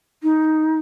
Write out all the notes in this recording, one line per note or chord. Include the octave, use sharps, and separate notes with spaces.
D#4